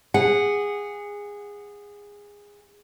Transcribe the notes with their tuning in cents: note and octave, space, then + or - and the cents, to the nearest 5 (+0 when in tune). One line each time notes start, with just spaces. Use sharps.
G#4 -20 F#5 +0